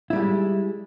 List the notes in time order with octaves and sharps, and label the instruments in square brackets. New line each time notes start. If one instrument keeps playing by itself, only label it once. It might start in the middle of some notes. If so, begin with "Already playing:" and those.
[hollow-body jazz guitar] E4
G3
G#3